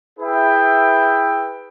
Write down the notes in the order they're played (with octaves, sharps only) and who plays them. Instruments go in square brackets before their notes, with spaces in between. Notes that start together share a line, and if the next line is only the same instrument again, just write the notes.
[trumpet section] E4 G#4 B4 E5 G5